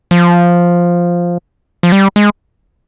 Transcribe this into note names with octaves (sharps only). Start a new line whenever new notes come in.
F3
F3
G3
G#3